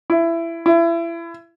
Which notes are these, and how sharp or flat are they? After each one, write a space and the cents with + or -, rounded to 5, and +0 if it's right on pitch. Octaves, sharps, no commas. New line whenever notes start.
E4 +20
E4 +30